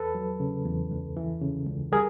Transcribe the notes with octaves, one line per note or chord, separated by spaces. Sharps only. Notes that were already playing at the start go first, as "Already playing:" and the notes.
Already playing: E2 A4 B4
F#3
C#3
E2
C#2
E3
C#3
C#2
G3 G#4 A#4